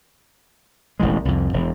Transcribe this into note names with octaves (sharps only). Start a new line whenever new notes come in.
E1 A1 E3 G#3
C2 F2
E1